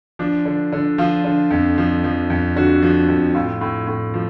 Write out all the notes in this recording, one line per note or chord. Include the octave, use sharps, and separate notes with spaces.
F3 D4
D3
D3
F3 F4
D3
F2
F3
F3
F2
D3 F#4
F3
F2
A2 F4
A2
A2
F3